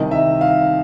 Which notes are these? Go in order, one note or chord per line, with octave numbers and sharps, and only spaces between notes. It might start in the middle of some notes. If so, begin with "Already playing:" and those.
Already playing: C2 C3 D#3 D#5
E5
F5